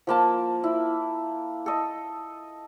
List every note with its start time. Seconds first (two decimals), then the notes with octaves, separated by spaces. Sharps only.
0.07 F3 A#3 A5
0.64 E4
1.66 A4 D#5